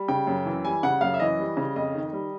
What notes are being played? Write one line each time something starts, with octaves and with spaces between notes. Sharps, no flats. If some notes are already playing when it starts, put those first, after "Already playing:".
Already playing: G3
C#3 G5
F#2
E3
G3 G#5
C#3 F#5
F#2 F5
E5
E3 D#5
G3
C#3
F2 D#5
D#3
G3